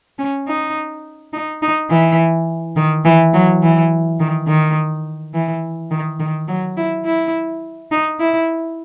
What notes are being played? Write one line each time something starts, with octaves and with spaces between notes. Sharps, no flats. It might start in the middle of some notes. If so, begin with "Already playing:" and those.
C#4
D#4
D#4
D#4
E3
D#3
E3
F#3
E3
D#3
D#3
E3
D#3
D#3
F#3
E4
E4
D#4
E4